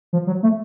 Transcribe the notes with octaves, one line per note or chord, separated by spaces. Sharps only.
F3
F#3
A3